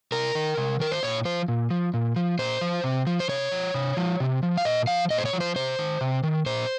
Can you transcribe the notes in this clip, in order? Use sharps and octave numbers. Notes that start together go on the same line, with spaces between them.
C3 A#4
D#3
C3
D#3 A#4
C5
A#2 C#5
F3 C5
A#2
F3
A#2
F3
A#2 C5
F3
C3
F3
C5
C3 C#5
F3
C3
F3
C3
F3
F5
A#2 D#5
F3 F5
A#2 D#5
C5
C#5
F3
C5
C3 C5
D#3
C3
D#3
A#2 C5